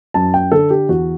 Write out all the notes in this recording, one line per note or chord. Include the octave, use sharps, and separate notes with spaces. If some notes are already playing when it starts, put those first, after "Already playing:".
F#2 A5
G5
D3 A4
G4
E2 F#4